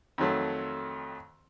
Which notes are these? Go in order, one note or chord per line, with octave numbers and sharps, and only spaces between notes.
F2 D#3 F#3 A3